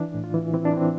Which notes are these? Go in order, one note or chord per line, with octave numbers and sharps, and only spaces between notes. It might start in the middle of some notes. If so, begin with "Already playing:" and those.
Already playing: E3 D4
A2
F4
E3
E3 C4
D4
E3 C4